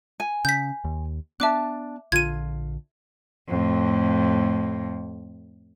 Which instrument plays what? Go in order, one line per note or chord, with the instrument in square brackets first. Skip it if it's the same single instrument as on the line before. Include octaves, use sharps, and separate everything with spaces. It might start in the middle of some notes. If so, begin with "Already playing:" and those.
[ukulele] G#5
[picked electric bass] C#3 [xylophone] G6 B6
[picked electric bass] D#2
[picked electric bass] B3 [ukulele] D4 A5 [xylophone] E5 D6 F#6
[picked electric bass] A#1 D3 [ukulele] F4 [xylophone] G#6 D#7
[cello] F2 A2